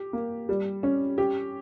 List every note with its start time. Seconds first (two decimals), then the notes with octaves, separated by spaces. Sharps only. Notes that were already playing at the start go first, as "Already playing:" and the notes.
Already playing: G4
0.13 A#3
0.49 G3
0.83 C#4
1.18 G4